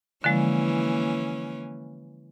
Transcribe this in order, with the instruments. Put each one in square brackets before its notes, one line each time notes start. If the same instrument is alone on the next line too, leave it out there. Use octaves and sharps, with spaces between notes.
[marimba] D3 F3 G#3 [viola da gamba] E3 A#3 C#4